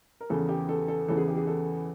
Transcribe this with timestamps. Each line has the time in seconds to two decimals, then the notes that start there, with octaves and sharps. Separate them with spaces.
0.21 A#4
0.30 E2 C#3 E3 A4
0.49 G4
0.69 A4
0.88 A4
1.08 E2 C#3 E3 A4
1.17 G#4
1.28 G4
1.37 G#4
1.47 A4